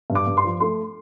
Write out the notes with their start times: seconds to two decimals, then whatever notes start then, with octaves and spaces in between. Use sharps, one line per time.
0.10 G2
0.15 D6
0.27 G2
0.37 C6
0.44 F3
0.60 A3 C6